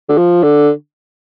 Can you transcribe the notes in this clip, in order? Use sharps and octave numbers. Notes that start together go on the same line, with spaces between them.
D3
F3
D3